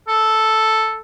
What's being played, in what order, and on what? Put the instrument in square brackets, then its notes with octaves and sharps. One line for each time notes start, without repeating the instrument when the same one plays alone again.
[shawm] A4